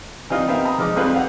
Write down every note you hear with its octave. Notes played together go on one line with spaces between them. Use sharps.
E3 G3 C4 D#4 F4
B3 C4 D#4 A#4 E5 F5
A#5 B5 D#6
F3 G#3 D#4 D6
F2 G3 C4 F4 G#4 B4
F5 F#5